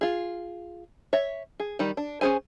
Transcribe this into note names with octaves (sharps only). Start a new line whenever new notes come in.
F4 G#4
C#5 E5
G#4
D#3 G3
D4
C#4 F#4 G#4 C5 G#5